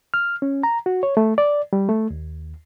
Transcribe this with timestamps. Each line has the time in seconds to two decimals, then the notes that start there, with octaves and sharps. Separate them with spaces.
0.14 F6
0.42 C#4
0.63 A#5
0.86 F#4
1.03 C#5
1.17 A3
1.38 D5
1.73 G3
1.89 A3
2.10 D#2